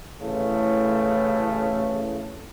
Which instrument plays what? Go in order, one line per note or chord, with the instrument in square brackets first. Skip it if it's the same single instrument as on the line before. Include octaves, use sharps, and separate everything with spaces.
[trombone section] A1 A2 C#3 A3